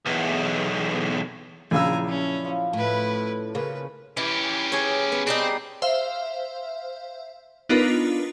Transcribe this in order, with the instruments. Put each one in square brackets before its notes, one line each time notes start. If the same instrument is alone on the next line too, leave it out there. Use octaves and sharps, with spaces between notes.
[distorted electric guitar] B1 E2
[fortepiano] A#1 C#3 E6 [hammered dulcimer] F#2 D4 E4 [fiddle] G#5 A#5
[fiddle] C#4
[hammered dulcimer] F3
[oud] A2 [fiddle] E4 B4
[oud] C#3 A#3 [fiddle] B4
[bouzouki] E3 [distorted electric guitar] C#4 G4
[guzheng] G#4 C#5
B3
[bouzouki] G3 D4 D#4 [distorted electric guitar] C4
[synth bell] C5 E5 F5
B3 D4 D#4 F4 A#4 B4